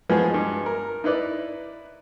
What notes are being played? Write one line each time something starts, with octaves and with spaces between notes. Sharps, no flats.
E3 F3 G#3 B3 F#4 G#4
G2 G#3
A#4
D#4 E4 B4 D5